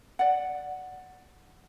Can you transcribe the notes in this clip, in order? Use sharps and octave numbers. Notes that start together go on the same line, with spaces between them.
D5 F#5